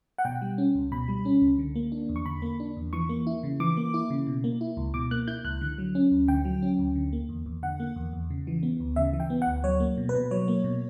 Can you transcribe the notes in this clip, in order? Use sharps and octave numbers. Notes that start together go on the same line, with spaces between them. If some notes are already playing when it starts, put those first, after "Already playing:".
F#5
B2 G5
G3
C#4
C#2
B2 B5
G3
C#4
C#2
D3
A#3
D4
E2
C#6
D3 B5
A#3
D4
E2
E3 C#6
A#3
E4
C#3
E3 D6
A#3
E4
C#3
B2
A#3
E4
C#2
B2 D6
A#3 F#6
E4 G6
C#2 F#6
D3
F#3
C#4
D2
D3 G5
F#3
C#4
D2
D3
A#3
E2
E2
D3 F#5
A#3
E2
E2
C#3
E3
B3
D2
C#3 E5
E3
G5
B3
F#5
D2
F#3 C#5
A#3
B2
B4
B2
F#3 C#5
A#3
B2